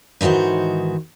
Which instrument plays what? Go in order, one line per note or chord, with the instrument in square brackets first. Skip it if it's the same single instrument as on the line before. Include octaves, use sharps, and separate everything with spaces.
[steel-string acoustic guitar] G#2 D#3 E3 F#4 C5